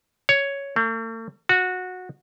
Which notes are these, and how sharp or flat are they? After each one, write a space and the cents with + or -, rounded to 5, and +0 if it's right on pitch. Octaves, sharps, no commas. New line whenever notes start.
C#5 +5
A3 +45
F#4 -15